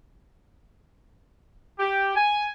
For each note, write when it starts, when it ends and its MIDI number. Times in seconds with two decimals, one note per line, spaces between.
1.79 2.13 67
2.16 2.49 80